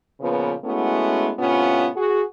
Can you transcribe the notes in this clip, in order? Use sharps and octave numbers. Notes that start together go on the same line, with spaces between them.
A#2 C#3 F3 B3 B4
G#3 A3 B3 C#4 E4 F#4
A2 C3 B3 C#4 F4
F#4 G#4